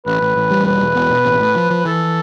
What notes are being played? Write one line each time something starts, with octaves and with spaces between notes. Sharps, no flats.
A1 B4
A1
A1
G3
E1 B4
E1
B2
B2
A1
A2
F3
F3
E3 A4